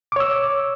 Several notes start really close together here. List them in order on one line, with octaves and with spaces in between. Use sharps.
D6 C#5 E6